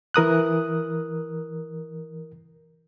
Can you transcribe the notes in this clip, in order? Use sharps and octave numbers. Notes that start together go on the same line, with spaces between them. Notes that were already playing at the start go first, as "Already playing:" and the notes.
E3 A#4 D#6 F#6